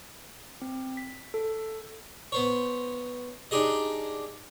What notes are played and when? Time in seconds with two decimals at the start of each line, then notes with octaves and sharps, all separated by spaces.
0.62 C4
0.97 B6
1.34 A4
2.32 B3 C5 C#5
3.51 D4 D#4 G4 G#4 D#5